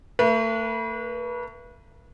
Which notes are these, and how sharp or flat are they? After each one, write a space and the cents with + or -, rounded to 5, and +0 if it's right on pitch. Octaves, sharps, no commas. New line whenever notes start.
A3 +40 B4 -30